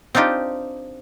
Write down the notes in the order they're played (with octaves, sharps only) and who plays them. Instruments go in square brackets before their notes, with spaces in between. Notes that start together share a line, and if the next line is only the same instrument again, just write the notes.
[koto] C4 D4 D#4 F4 G4